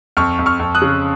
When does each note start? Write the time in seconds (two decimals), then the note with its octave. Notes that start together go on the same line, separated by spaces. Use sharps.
0.17 F2 C#6 F6
0.39 F2
0.46 C#6 F6
0.60 F2
0.75 D#6 F#6
0.82 C#3